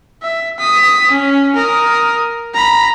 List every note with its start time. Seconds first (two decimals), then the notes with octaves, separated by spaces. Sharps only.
0.23 E5
0.59 D#6 B6
1.11 C#4
1.56 A#4 D#6
2.54 A#5 B5